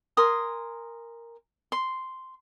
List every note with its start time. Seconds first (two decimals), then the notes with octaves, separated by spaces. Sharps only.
0.17 A#4 G#5 C6 D#6
1.72 C6